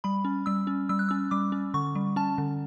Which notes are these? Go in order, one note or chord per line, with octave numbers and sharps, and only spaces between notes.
G3 B5
C#4
G3 E6
C#4
G3 E6
F#6
C#4 E6
G3 D6
C#4
D3 C#6
G3
C#4 A5
D3